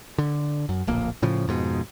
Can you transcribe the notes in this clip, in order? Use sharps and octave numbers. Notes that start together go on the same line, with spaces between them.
D3
F#2
D1 A#1 A#3
A2 C#3 F3
F2 G#2 B2